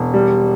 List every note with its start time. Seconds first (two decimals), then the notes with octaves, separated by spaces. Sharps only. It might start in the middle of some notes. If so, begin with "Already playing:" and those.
Already playing: E1
0.14 G3